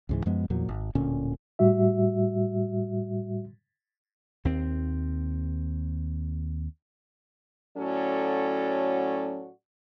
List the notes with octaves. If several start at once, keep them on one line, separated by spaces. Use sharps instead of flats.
C#2 G#2 E3
F#2 F3 G#3 B3
E2 A#2 F3 F#3
G#1
D1 A#2 D3 C#4
A2 G3 F#4 E5
D#2 C4
A2 F#3 C#4 F#4 A4 D5